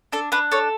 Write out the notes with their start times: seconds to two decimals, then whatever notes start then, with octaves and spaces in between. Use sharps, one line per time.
0.12 D4 A4
0.32 D4 B4
0.52 A4 C#5